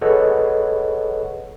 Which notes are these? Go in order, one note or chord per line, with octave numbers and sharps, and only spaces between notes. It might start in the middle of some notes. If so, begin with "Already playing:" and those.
G#4 A4 B4 C#5 D#5 F#5